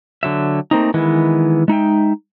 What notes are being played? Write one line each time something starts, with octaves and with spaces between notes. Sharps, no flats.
D3 F#3 E5
A3 A#3 C4 D#4
D#3 E3 G#3 B3 E4
G#3 D#4 E5 G5